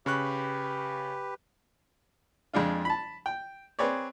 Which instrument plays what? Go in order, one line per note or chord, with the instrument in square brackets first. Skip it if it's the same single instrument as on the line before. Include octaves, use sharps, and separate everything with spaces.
[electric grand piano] C#3 C#6 F#6 [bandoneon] G4 B4
[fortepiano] F2 G#3 D4 F4
A5 B5
G5
C4 G#4 B4 C#5 D5